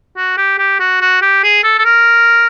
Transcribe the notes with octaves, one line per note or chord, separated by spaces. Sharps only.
F#4
G4
G4
F#4
F#4
G4
G#4
A4
A4
A#4